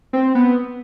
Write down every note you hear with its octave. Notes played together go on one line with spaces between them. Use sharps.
C4
B3